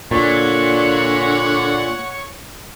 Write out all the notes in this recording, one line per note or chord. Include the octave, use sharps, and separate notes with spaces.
A#2 D3 C#5 F#5 C#6